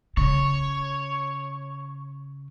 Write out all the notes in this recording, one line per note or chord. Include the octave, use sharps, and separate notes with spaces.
C#3 C#5